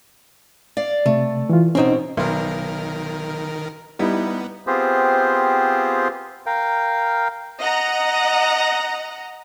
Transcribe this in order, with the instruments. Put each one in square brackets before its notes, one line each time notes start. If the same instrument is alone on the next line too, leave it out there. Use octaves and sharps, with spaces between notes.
[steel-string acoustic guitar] D5 F5
[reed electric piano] C3 [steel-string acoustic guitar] A3
[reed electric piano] E3 F4
[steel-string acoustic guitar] D#2 B2 C4 [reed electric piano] C#4 D#4
[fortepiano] B1 [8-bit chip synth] D#3 A#4
[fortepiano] G3 D#4 E4 [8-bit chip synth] B3
[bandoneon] B3 C4 F4 G4 G#4 C5
A#4 F5 G5
[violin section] D#5 F#5 A#5